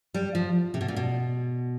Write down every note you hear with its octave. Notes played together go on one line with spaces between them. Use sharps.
G3
F3
C3
B2
A#2
B2